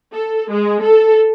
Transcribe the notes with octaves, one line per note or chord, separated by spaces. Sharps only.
A4
G#3
A4